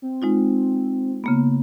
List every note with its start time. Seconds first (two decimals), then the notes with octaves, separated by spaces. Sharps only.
0.02 C4
0.22 G#3 D#4 F4
1.24 C#3 A#3 B3